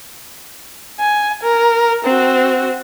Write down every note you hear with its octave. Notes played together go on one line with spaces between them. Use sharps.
G#5
A#4
C4 F#4